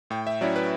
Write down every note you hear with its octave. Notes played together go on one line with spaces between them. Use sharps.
A2 G5
E5
F#3 C#4 E4 D5
B4